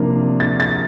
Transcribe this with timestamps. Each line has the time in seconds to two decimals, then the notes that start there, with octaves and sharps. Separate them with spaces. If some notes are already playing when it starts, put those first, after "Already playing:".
Already playing: C3 F3 A#3 D4 F4
0.40 A6
0.60 A6